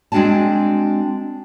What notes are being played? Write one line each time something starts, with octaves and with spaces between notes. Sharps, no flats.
G#3 C4 D4 F#4 G#5 A5